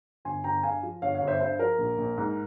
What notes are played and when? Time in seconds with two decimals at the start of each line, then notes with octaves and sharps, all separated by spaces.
0.25 G1 G#5 C6
0.44 G1 G5 A#5
0.63 G2 F5 G#5
0.83 F3
1.02 G1 C#5 F5
1.15 C#5 F5
1.22 G1
1.28 C5 E5
1.40 G2 C5
1.59 F3 A#4
1.79 A#1
1.98 A#1
2.17 G#2